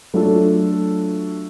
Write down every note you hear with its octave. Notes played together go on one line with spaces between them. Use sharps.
F#3 A3 D4 F4 A4